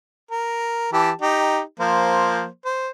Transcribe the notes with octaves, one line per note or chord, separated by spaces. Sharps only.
A#4
E3 G4 A5
D#4 G4
F3 A#3 C5
C5